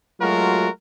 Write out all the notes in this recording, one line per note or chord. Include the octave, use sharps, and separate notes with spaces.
F#3 G#3 A3 F4 F#4 A#4